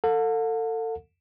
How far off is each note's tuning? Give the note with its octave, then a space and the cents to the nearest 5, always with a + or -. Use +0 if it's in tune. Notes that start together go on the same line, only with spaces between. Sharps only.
A4 +30 F#5 -45